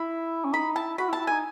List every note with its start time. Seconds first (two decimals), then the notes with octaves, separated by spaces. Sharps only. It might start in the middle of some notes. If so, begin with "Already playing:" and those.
Already playing: E4 B5
0.45 C#4
0.54 D#4 B5
0.76 E4 A5
0.98 F#4 B5
1.09 E4
1.13 A5
1.20 E4
1.27 D#4 G#5